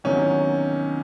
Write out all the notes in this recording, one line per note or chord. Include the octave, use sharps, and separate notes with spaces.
E2 C3 D#3 F#3 C#4